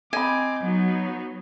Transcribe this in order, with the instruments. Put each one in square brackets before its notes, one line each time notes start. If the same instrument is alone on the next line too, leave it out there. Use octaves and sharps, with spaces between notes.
[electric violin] C4 D6 [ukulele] D#5 B5 [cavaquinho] G#5
[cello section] F#3 [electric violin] B3 D#4